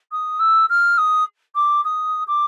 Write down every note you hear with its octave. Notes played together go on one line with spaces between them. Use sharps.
D#6
E6
F6
D#6
D6
D#6
D6